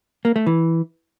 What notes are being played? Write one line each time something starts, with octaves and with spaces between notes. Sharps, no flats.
A#3
A3
E3